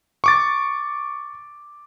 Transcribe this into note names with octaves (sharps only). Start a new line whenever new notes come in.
C#6 D6 A6